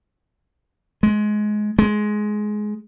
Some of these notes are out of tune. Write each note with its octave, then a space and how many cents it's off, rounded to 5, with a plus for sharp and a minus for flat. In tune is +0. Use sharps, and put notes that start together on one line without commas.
G#3 +20
G#3 +15